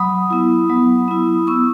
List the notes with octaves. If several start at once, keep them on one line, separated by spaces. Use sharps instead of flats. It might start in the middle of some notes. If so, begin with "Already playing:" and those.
Already playing: F#3 B5 D#6
B3 E4
F#3
B3 E4
B3 C#6 E6